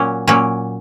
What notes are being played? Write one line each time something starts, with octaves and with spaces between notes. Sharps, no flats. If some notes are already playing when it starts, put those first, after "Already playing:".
Already playing: A#2 F#3 A#3 C#4
A#2 F#3 A#3 C#4